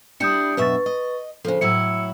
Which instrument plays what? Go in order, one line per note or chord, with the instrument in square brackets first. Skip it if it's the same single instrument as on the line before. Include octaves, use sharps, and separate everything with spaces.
[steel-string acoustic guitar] G3 D4 E4 [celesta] D#6 G6 C#7
[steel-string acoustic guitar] F#2 B2 E5 [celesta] B4 C#6 A6
[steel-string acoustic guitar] D#5
[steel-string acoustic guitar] C#3 F3 [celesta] A4 C5
[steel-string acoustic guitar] A2 F#3 E4 [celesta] E6 C#7